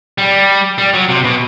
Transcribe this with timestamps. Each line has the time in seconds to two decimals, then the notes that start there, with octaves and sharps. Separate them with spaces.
0.18 G3
0.78 G3
0.94 F#3
1.09 C3
1.24 B2